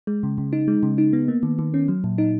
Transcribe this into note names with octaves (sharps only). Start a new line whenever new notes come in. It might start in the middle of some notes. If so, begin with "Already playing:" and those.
G#3
C#3
C#3
D#4
G#3
C#3
D#4
B3
A#3
D#3
D#3
C#4
F#3
A#2
D#4